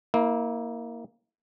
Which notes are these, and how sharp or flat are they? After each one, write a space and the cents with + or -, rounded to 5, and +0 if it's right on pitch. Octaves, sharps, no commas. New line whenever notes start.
A#3 +0 E4 -30